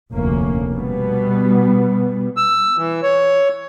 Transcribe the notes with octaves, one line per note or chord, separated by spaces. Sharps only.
F1 D2 A#3 C#4
B2 G3 B3
E6
E3
C#5